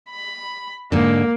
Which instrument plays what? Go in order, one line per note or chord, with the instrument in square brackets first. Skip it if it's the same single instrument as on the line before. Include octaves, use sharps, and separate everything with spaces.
[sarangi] B5
[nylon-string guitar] G#2 D3 [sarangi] A#3